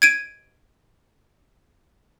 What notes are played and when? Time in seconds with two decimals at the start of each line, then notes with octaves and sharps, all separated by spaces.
0.02 G#6 D7 D#7